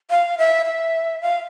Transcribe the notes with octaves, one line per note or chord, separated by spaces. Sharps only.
F5
E5
E5
F5